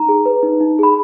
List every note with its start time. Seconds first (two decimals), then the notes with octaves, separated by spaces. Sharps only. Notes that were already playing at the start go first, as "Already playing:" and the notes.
Already playing: D#4 A#5
0.09 G#4
0.26 B4
0.43 D#4
0.60 D#4
0.79 G#4 B5